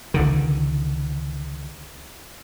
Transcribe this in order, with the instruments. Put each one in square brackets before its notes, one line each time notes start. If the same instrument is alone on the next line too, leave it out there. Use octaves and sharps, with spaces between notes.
[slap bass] C#2 D3 D#3